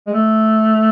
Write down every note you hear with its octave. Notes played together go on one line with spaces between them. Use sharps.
G#3
A3